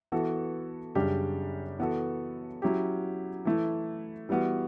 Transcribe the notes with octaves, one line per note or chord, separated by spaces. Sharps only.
E3 B3 F#4 A4
F#2 C#3 G3 D4 G4
E3 B3 F#4 A4
F#3 C#4 E4 G4
E3 A3 E4
E3 G3 B3 F#4